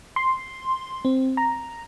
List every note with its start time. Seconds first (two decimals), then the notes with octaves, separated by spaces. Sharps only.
0.16 C6
1.05 C4
1.37 A#5